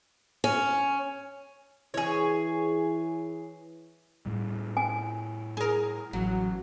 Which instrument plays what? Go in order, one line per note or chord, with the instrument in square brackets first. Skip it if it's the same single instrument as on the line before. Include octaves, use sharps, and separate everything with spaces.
[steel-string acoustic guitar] C#4
[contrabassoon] E3 [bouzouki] G#4 C#5
[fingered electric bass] A2 G3
[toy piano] G#5
[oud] G#4 A#4
[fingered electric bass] A1 [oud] F#3